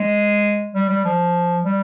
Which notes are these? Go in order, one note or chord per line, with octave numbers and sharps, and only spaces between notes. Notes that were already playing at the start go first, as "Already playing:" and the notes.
Already playing: G#3
G3
G3
F3
G3